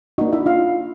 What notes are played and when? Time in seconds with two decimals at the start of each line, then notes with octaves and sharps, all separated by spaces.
0.18 A#3 D4 D#4 F#4 D#5
0.33 E4 E5
0.46 F4 F5